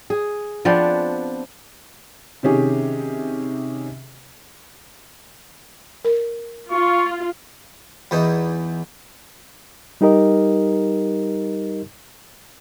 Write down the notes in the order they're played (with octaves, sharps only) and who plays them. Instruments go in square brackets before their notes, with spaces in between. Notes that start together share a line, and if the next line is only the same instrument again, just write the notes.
[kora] G#4
F3 B3 C4 D4
[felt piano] C3 D#3 C#4 G4 G#4
[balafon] A#4
[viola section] F4 [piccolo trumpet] C#6
[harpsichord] E2 E3 D#4
[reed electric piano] G3 D#4 G4 A#4 D#5